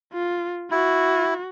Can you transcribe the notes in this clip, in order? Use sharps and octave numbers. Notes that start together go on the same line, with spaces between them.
F4
E4 F#4